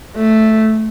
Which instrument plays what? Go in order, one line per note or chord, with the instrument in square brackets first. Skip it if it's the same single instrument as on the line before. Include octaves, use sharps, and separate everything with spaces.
[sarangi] A3